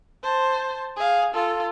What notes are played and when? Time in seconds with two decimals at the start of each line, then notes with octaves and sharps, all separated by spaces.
0.23 C5 A5
0.96 G#4 F5
1.34 F4 A4